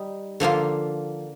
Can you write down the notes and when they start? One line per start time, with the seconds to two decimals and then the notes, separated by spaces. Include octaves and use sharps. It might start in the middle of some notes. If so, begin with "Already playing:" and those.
Already playing: G3 D#4
0.40 D3 F3 A#3 F4